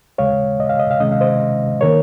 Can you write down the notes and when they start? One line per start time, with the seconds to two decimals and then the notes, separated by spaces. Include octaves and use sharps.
0.18 D#2 C#3 G#3 C#5 F5
0.60 D#5
0.69 F5
0.79 D#5
0.91 F5
1.00 C3 D#3 G#3 C#4 D#5
1.12 F5
1.21 C5 D#5
1.81 D#3 A#3 A#4 C#5